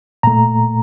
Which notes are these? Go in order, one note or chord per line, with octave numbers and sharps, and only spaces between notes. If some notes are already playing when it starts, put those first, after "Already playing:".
A#2 A3 A#5